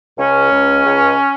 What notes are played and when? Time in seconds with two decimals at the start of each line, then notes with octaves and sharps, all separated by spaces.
0.18 C#2 C#4
0.52 C#2
0.86 C#2